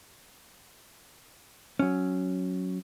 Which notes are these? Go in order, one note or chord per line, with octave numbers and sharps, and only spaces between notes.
F#3 C#4